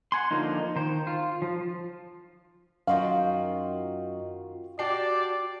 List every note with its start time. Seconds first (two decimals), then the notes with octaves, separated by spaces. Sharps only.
0.12 F#5 G#5 C6
0.31 D3 F3 A#3 D#4
0.76 D#3 C5
1.07 F4
1.42 F3
2.87 F#2 D#3 F4 F#4 D#5 F5
4.79 D4 F#4 G4 D5 C7